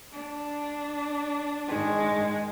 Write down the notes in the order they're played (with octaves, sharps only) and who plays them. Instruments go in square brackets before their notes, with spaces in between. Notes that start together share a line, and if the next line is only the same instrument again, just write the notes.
[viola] D4
[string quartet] G#2 D#3 G#3